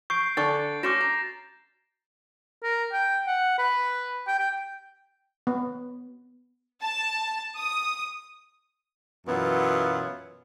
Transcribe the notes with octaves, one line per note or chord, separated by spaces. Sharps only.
C#6 G6 C7 D7
D3 D4 A4 D5 C#6 A6
A3 C#4 F#4 D6 A#6 E7
A#5
A#4
G5
F#5
B4
G5
G5
B3
A5
D#6
F#2 B2 E3 F#3 B3 F4